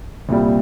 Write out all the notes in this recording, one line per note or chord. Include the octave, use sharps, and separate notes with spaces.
C2 A#2 G3